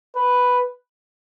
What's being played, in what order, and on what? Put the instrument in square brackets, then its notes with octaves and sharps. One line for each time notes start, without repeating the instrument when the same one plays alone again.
[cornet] B4